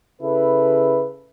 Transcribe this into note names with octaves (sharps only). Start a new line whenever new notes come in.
C#3 E4 A4 B4